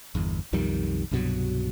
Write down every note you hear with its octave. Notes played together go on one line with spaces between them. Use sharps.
G1 E2
B1 F2 D#3 G3
C2 G2 B2 F#3